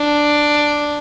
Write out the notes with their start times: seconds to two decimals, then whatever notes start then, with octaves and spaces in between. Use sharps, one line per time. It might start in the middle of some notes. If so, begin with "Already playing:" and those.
Already playing: D4